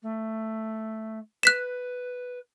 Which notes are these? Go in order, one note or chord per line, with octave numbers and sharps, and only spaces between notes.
A3
B4 F#6 B6 E7